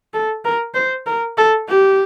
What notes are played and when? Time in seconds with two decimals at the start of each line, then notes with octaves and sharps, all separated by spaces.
0.14 A4
0.45 A#4
0.74 C5
1.06 A#4
1.37 A4
1.68 G4